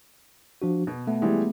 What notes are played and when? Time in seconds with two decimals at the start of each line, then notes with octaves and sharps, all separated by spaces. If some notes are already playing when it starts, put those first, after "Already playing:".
0.62 F3 D4 F#4
0.87 B2 B3
1.07 A3 B3
1.22 E3 G3 G#3